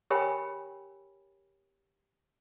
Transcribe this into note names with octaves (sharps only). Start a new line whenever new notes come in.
G4 A#4 C#5 G5 G#5 B5